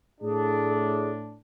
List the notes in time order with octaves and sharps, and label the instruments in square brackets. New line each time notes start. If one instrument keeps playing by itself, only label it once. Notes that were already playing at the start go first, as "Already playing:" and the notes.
[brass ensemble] A2 D4 [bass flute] G#4